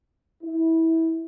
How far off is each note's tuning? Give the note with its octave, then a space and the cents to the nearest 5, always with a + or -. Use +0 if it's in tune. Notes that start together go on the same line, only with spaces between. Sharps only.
E4 -20